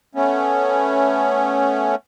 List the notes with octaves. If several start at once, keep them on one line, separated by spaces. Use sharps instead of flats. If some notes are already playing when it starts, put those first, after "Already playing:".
A3 B3 C#4